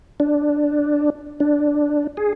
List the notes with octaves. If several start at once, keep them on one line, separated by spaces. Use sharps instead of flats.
D4
D4
G#4